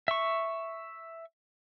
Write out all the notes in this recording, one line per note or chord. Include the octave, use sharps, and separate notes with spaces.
E5 C#6